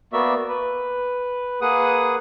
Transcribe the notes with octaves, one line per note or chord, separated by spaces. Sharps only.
A#3 B3 F#4 D5 E5
B4
A#3 G#4 B4 F#5 D#6